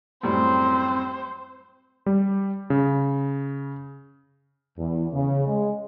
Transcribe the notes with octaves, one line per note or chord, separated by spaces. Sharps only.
F#2 A2 G3 C4 C5
G3
C#3
E2
C#3
G#3